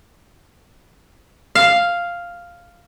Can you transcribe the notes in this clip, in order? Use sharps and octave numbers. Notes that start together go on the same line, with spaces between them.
F5